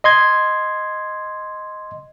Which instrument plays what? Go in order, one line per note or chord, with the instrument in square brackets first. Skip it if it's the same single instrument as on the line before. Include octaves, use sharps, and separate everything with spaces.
[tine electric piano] D#5 C6 G#6